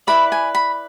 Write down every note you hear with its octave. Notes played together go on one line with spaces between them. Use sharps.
E4 B4 D5 B5
G#5
B5